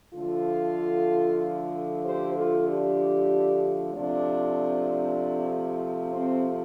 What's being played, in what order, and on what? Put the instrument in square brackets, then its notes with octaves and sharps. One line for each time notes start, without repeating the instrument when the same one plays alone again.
[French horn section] D3 F3 A3 F4 A4
G4 C5
F4 A4
D4 G4
C3 F3 A3 D4
C4